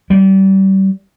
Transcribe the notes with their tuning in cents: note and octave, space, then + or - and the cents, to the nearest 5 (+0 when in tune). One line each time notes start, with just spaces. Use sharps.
G3 -30